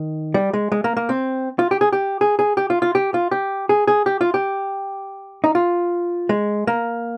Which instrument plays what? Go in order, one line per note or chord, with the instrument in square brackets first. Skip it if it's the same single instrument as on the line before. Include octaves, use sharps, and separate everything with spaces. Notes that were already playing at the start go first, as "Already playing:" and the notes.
Already playing: [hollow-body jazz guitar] D#3
G3
G#3
G#3
A#3
A#3
C4
F4
G4
G#4
G4
G#4
G#4
G4
F4
F4
G4
F4
G4
G#4
G#4
G4
F4
G4
D#4
F4
G#3
A#3